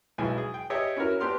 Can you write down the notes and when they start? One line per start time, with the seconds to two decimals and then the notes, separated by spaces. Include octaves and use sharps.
0.18 B1 G#3 E4 G#5
0.38 G#4
0.54 G5
0.70 G4 G#4 C#5 D#5 E5
0.96 C#4 E4 F#4 A#4
1.20 C4 D4 G4 B4 C6 F6